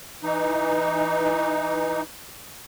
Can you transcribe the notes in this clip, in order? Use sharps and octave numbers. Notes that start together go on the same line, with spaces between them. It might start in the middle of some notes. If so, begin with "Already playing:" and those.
E3 D#4